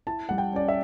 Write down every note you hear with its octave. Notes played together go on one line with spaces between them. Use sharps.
E4 A5
G3 F#5
G5
C#4 D5
E5